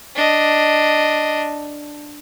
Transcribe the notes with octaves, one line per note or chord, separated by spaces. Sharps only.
D4 D#5